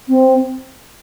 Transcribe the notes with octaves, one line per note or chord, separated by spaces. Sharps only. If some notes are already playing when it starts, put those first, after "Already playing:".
C4